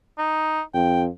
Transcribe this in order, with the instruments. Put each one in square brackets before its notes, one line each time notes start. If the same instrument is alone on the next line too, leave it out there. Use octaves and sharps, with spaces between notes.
[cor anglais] D#4
[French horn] F2 [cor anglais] G5